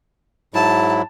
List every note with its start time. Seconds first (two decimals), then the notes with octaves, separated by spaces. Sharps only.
0.54 G#2 F#3 E4 A5